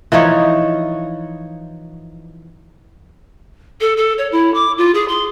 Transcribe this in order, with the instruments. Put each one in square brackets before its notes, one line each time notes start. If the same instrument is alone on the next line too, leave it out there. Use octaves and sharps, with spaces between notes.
[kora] E3 F3 D#4 C#5
[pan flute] A4
A4
C#5
E4
D6
F4
G#4
C6